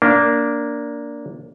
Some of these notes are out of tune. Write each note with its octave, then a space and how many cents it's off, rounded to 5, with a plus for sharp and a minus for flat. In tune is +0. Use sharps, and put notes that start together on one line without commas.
A#3 +0 D4 -15